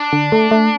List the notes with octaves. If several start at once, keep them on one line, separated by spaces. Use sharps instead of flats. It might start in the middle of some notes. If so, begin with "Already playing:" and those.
Already playing: D4
D3
A3
A3